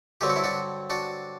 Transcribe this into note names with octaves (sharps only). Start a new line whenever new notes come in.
G2 D3 F#3 C4 G4
F#4
E4
D4 F#4
D4 F#4